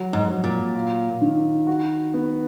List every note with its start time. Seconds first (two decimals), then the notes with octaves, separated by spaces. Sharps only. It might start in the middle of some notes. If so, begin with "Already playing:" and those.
Already playing: F#3
0.13 G#2
0.28 F#3
0.44 A#2
0.75 F4
1.21 D#3
1.67 F#4
2.14 B3